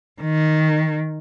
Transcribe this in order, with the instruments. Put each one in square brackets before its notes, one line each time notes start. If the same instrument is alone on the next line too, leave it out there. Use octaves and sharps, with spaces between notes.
[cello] D#3